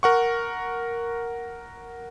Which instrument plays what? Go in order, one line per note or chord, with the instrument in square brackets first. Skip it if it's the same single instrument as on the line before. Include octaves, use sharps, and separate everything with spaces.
[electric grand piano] A#4 F#5 C#6